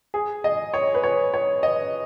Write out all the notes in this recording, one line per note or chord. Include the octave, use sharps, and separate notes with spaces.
G#4
D#5
C#5
B4
C#5
C#5
D#5